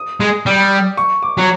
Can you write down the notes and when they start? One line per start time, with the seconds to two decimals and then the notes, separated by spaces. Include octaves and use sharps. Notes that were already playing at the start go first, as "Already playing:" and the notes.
Already playing: D#6
0.20 G#3
0.46 G3
0.97 C#6
1.23 D6
1.38 F#3